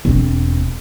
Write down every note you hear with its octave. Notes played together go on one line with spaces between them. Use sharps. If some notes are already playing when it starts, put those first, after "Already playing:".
E1 C4